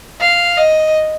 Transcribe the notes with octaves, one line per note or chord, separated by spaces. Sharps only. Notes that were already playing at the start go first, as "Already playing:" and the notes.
F5
D#5